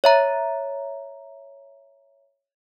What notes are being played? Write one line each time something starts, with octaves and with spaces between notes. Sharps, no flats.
C#5 E5 A#5